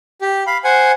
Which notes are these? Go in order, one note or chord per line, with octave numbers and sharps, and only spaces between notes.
G4
F5 B5
C5 F#5 G#5